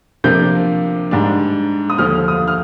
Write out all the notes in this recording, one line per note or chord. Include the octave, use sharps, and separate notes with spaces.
C3 F3 A#3 D4 G6
G#2 G3 D4
D#6
D#2 D3 F3 F6
D#6
F6